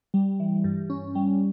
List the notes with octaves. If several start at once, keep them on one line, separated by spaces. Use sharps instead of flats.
G3
E3
G2
C#4
G3